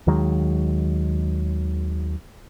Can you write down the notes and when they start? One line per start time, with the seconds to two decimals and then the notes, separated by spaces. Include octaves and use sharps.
0.07 D#2 D#3 F#3 G#3